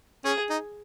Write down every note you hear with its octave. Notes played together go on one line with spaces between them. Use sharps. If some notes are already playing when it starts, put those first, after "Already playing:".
C#4 G#4
D#4